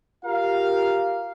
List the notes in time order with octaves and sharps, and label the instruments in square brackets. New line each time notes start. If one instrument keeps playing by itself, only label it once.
[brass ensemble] F4 G4 A#4 F5